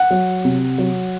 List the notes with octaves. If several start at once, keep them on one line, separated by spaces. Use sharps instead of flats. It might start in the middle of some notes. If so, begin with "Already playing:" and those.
Already playing: F#5
F#3
C3
F#3